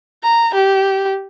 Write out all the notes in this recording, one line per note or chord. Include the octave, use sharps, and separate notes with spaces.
A#5
G4